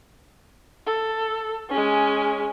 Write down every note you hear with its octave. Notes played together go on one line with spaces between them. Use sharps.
A4
G#3 C#4